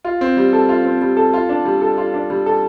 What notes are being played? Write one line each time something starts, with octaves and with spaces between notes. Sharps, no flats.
F4
C4
G3
A4
F4
C4
G3
A4
F4
D4
G3
A4
F4
D4
G3
A4